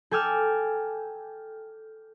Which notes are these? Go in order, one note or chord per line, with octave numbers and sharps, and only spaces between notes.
A4 G5 G#5 D6 E6 F6